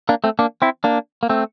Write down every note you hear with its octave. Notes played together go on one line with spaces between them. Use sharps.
A#3 D4
A3 C4
A#3 D4
C4 E4
A#3 D4
A#3
A3 C4